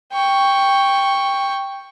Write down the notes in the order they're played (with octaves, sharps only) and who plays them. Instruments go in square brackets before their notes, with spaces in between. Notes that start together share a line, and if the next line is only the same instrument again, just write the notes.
[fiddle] G5 C#6